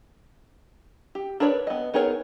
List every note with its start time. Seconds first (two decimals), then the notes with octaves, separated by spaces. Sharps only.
1.15 G4
1.40 D4 A#4 B4 C#5 D5
1.67 B3 D#5
1.94 B3 D#4 G#4 A#4 C#5